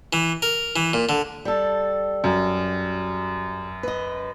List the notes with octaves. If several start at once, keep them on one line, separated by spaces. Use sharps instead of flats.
E3
A#4
E3
A#2
D3
G3 A4
F#2
B4 D#5